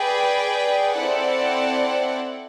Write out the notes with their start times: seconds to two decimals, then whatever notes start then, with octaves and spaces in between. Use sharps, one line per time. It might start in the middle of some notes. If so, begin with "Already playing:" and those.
Already playing: G#4 B4 D5 G5
0.94 C4 E4 A4 D5 F#5